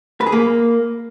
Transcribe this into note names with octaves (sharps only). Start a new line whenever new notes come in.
B4
G#4
A#3